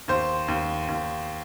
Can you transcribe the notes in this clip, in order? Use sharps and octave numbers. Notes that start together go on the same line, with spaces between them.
D#2 C5
D#2
D#2